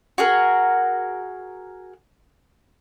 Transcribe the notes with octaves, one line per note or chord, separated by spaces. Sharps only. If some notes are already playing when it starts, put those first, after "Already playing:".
F#4 G#4 A#4